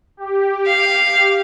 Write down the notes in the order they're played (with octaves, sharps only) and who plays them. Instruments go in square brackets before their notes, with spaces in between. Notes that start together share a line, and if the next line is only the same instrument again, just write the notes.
[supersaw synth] G4
[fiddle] F5